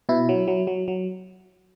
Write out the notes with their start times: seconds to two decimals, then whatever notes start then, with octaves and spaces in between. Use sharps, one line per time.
0.09 B2 E4
0.29 F#3
0.48 F#3
0.67 F#3
0.88 F#3